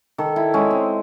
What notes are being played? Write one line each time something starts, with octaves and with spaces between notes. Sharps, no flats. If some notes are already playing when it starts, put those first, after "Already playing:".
D#3 A4
E4
G#3 C#4
C4